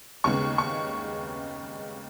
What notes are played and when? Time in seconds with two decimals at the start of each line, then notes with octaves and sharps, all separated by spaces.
0.24 D#2 C#3 G#3 B3 C#6
0.58 C#6